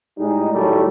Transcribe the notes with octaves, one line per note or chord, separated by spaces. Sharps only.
A2 G3 G#3 D#4
A2 D#3 F#3 G3 A3